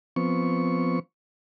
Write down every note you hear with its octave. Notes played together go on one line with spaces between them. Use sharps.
F3 B3 C4 C#6